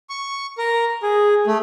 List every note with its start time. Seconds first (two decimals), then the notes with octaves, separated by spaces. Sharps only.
0.10 C#6
0.58 A#4
1.03 G#4
1.47 A3